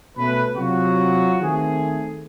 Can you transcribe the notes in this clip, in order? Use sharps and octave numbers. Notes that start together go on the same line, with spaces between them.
B2 A3 C#4 B4
C3 F#3 F4 F#4
D#3 A3 C4 G#4